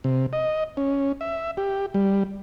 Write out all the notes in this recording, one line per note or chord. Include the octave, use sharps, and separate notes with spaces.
C3
D#5
C#4
E5
G4
G3